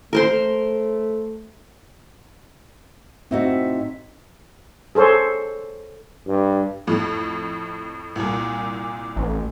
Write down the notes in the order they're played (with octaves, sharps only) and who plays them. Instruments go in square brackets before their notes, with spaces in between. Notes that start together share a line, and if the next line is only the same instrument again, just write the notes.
[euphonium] A3 [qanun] A#4 C5 C6
[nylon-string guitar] A2 D#4 F#4 [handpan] C4 E5
[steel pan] G#4 A4 C5 C#5
[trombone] G2
[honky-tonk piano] F2 A2
C2 A#2
[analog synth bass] A1